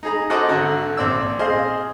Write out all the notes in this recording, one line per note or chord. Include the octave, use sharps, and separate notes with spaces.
D#4 G#4 A#5
F#4 A4 C5 D#5 D6 D#6
G#1 D3 F#4 A#5
A#1 C4 D5 E6
G#4 C5 D#5 F5